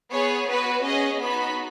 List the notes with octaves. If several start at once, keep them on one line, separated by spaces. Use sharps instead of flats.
B3 G#4 C#5
B3 F#4 B4
C#4 G#4 D#5
B3 D#4 F#4 B5